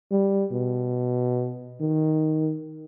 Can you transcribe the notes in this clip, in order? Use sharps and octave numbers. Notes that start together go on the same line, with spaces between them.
G3
B2
D#3